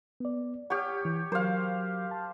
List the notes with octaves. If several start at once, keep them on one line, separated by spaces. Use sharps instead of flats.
B3 D5
G4 C#5 F#5 F6
E3
F#3 A#4 C5 F5
A5